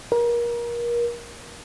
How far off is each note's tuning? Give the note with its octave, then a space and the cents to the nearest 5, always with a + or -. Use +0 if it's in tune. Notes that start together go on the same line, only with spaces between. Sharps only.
A#4 +30